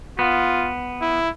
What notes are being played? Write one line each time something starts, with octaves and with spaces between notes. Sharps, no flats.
B3 F4
E4